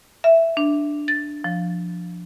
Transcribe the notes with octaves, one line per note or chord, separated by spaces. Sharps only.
E5
D4
A6
F3